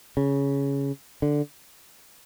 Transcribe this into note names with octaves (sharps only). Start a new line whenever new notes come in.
C#3
D3